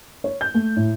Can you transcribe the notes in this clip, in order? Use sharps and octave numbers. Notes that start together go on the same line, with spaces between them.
C#5
G6
A3
A2